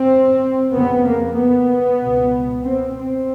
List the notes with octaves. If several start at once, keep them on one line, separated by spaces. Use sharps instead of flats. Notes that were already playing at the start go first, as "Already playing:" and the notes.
Already playing: C4
F2 C#3 B3
A#3
B3
C#2 B2
C4
C4